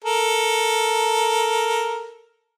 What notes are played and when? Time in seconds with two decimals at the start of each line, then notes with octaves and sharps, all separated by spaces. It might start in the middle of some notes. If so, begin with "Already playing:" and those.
0.04 A4 A#4